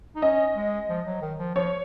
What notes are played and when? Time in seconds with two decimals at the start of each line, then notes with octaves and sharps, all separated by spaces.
0.16 D#4
0.22 C#4 D#5
0.56 G#3
0.89 F3
1.06 F#3
1.22 D#3
1.38 F3
1.55 F3 C#5